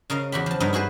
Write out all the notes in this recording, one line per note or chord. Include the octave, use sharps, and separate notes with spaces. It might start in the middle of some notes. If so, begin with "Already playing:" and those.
C#3 A#4 D#5 F5
E2 F#4 G4 B5
F3 A5
G2 B3 D#4 A#4
E4 F#4 G#4 B4 C5